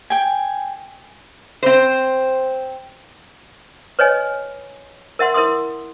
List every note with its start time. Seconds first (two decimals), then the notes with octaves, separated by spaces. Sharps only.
0.10 G5 G#5
1.63 C4 C5
3.99 B4 C#5 D#5 G#5
5.19 A#4 E5 F#5 C6
5.34 E4 A#4 E5 C6 D#6